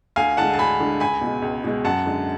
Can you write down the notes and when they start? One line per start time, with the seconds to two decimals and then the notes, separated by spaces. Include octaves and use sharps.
0.16 D2 F5 G#5
0.37 D3 G#3 F#5 A5
0.54 A5
0.58 D2 G#5 B5
0.80 D3 G#3
1.00 C#2 G#5 B5
1.21 B2
1.26 G#3
1.42 C#2
1.64 B2 G#3
1.84 F#2 F#5 A5
2.06 D3 G#3